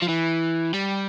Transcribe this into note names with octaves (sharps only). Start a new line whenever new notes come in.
F3
E3
G3